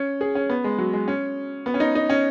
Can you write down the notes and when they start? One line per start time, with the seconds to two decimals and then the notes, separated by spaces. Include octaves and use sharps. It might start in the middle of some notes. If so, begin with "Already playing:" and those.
Already playing: C#4
0.21 G#4
0.35 C#4
0.49 B3
0.64 G#3
0.78 F#3
0.93 G#3
1.08 C#4
1.66 B3
1.74 C#4
1.80 D#4
1.95 D#4
2.10 C#4